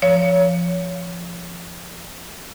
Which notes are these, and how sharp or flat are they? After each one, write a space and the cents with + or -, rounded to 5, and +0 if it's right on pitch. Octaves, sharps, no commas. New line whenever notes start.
F3 -15 C#5 +20